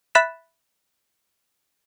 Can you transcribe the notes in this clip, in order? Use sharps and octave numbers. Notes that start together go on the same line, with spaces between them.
E5 B5 F#6 A6 B6 E7